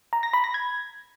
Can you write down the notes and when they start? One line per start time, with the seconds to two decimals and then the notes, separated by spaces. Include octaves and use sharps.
0.13 A#5
0.23 A#6
0.33 B5
0.44 A#6
0.54 G#6